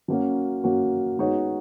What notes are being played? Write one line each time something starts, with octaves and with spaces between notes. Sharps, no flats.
F#3 A#3 C#4 F#4
F#3 A#3 C#4 F#4
G#3 B3 D#4 F#4 C#5